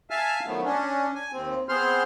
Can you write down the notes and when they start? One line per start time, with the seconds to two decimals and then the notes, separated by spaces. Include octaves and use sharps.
0.10 E5 F5 G#5 A5 F6
0.46 D#3 F3 F#3 A3 B3
0.64 C#4 D4
1.15 G#5
1.33 D#2 C4
1.69 B3 C4 G#4 C5 C6 F6